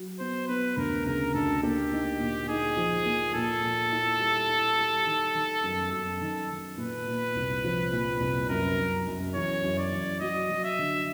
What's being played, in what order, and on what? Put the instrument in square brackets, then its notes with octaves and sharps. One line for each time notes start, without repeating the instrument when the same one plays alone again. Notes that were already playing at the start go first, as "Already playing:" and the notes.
Already playing: [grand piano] F#3
[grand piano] B3 [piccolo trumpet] C5
[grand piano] B3 [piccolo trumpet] B4
[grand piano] D2 [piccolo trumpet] A#4
[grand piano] C#3 [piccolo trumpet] A#4
[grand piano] D2 [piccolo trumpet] A4
[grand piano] A#3 [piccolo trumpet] G4
[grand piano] D#4
A#2
[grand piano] D#4 [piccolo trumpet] G#4
[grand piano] F3
A#3
[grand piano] A#2 [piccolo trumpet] A4
[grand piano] A#2
E4
G3
E4
G3
D#3
D#3
F#2
[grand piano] F#2 [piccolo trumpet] A4
[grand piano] D#3
D#3
[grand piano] A#2 [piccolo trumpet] B4
[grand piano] A#2
C2
F3
A#2
C2
[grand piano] F#2 [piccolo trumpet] A#4
[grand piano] F#2
F#2
[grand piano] E3 [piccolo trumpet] C#5
[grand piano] F#2
[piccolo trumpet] D5
[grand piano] E3
[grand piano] F#3 [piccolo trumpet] D#5
[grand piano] F#3
[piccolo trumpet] E5
[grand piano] D3